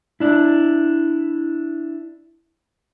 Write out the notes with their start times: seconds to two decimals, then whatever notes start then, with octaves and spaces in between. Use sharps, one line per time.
0.20 D4 E4